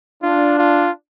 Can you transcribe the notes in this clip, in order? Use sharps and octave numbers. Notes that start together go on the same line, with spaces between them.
D4 F4
F4